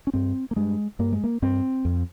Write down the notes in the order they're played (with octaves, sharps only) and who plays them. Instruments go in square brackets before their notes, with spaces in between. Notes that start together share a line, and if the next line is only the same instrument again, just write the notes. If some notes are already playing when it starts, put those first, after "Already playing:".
[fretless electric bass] C#4
G2 C4
A#3
G2 G#3
G2 A#3
G#3
A#3
G2 C4
F2